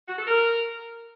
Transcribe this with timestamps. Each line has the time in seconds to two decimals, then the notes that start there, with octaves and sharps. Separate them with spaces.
0.08 F#4
0.17 A4
0.27 A#4